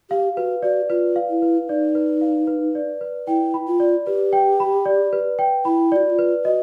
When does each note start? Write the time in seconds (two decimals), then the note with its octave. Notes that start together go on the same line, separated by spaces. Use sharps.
0.10 G4 F5
0.37 F#4 B4
0.62 F#4 D5
0.90 F4 B4
1.16 F5
1.29 E4
1.42 B4
1.69 D#4 D5
1.95 B4
2.21 F5
2.47 B4
2.75 D5
3.01 B4
3.27 E4 G5
3.54 B5
3.67 F4
3.80 D5
4.06 G4 B4
4.33 G5
4.60 B5
4.85 D5
5.13 B4
5.39 G5
5.65 E4 B5
5.92 F#4 D5
6.05 F#4
6.10 F4
6.19 B4
6.44 F#4 D#5